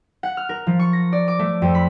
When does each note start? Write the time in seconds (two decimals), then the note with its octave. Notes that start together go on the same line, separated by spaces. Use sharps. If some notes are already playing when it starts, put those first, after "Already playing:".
0.23 F#5
0.37 F6
0.49 A#4
0.67 F3
0.79 C#6
0.93 A#6
1.13 D5
1.28 D6
1.39 A3
1.62 F2
1.75 B5